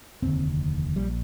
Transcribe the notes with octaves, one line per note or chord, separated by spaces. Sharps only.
F1 D#2 D3 C4
A#1 A#2 G3